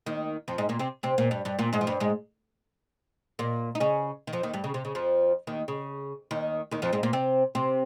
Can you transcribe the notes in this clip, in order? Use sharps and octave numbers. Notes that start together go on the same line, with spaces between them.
D#2 D#3
F2 F3
G#2 G#3
A#2 A#3
C3 C4
C3 C4
A#2 A#3
G2 G3
G2 G3
A#2 A#3
G#2 G#3
F3
G2 G3
G#2 G#3
A#2 A#3
D#4
C#3 C#4
D#3
F2 F3
D#2 D#3
G2 G3
C#3
C3
C#3
F2 F3
D#2 D#3
C#3
D#2 D#3
D#2 D#3
F2 F3
G#2 G#3
A#2 A#3
C3 C4
C3 C4